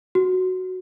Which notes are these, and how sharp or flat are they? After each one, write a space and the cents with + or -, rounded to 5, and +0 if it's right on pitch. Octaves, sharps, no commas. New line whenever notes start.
F#4 +5